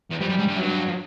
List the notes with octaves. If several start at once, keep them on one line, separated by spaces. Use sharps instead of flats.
E2
F2 G3
F#2
G#2
G2
F#2 F#3
G2
F3